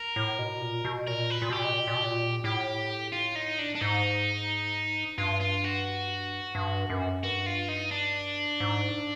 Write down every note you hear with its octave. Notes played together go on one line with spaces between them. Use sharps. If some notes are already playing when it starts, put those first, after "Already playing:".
Already playing: A#4
A2
B2
A#2
B2
A#2 A#4
B4
A#2
B2
A#2 G4
B2
A#2
B2
A#2
B2
A#2
A2 G4
F4
D#4
D4
D4
G#2 D#4
G2 F4
F4
F#4
G2
F#2
G2 F#4
F4
D#4
D4
G#2